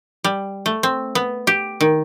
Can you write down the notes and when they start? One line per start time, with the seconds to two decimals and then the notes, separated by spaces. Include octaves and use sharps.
0.24 G3
0.66 A3
0.83 C4
1.15 B3
1.47 G4
1.81 D#3